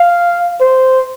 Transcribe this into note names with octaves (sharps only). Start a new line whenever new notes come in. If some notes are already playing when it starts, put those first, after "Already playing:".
Already playing: F5
C5